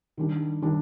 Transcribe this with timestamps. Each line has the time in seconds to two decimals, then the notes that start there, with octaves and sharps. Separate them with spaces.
0.17 D#3 G3 D4
0.62 D#3 G3 D4